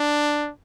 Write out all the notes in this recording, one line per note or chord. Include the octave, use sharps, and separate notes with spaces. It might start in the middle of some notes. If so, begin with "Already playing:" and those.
Already playing: D4